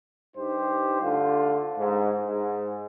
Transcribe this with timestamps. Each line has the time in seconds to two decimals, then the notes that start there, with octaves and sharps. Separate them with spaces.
0.37 G2 D#4 G4 C5
1.02 D3 A3 F4
1.78 G#2
2.26 G#2